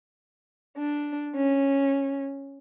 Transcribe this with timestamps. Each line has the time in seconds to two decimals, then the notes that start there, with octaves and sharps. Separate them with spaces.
0.76 D4
1.35 C#4